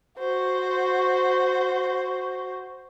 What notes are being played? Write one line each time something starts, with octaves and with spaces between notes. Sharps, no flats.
F#4 C5